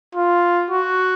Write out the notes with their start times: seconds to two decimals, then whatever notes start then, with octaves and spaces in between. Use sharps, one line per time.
0.15 F4
0.70 F#4